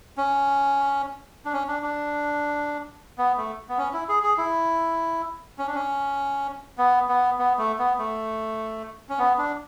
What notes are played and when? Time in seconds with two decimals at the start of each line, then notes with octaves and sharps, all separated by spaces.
0.18 C#4
1.45 D4
1.53 C#4
1.68 D4
1.83 D4
3.18 B3
3.38 A3
3.69 B3
3.78 C#4
3.93 E4
4.09 G#4
4.23 G#4
4.38 E4
5.58 C#4
5.67 D4
5.75 C#4
6.78 B3
7.09 B3
7.39 B3
7.58 A3
7.79 B3
7.99 A3
9.09 C#4
9.19 B3
9.38 D4